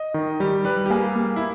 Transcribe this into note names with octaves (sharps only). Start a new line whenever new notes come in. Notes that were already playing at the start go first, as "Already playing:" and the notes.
Already playing: D#5
D#3
G3 G4
G3 B4
G4
A#3 G#4
A#3
E4